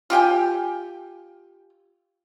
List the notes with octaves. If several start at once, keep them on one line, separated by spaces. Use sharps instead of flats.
F4 G4 G5 G#5